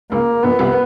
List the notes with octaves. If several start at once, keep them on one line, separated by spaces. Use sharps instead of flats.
C#2 C#3 A#3
A#1 A#2 B3
C2 C3